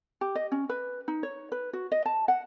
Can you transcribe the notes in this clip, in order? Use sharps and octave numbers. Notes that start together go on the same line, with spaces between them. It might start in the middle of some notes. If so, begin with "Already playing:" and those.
G4
D#5
C#4
B4
D#4
C#5
B4
F#4
D#5
A5
F#5